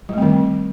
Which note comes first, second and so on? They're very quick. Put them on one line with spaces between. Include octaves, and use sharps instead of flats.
G3 A3 C4 D#3